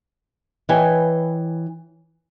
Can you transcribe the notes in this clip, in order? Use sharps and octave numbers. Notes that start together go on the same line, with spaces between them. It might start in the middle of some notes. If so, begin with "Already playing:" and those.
E3 B4 C#5 D#5 G5 G#5